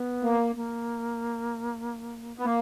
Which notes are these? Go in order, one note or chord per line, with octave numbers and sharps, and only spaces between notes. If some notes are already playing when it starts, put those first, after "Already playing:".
Already playing: B3
A#3
A#3
B3
A#3